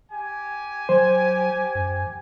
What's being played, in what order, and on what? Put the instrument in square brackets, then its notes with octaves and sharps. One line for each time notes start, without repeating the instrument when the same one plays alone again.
[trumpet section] G4 G#5
[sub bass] F#3 [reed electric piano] C5
[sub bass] F#2